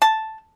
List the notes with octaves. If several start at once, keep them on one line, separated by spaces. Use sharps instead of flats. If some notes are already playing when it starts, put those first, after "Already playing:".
A5